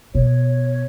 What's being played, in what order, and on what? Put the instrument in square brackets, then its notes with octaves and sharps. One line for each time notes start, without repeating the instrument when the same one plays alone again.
[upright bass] B2 [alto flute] C#5